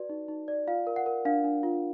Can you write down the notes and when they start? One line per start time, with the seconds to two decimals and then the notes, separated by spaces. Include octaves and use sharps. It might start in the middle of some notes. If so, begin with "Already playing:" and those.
Already playing: F#4 B4 D5
0.09 D#4
0.28 D#4
0.48 D5
0.67 F4 F5
0.87 A#4
0.96 F#5
1.06 A#4
1.25 D4 F5
1.44 D4
1.63 F4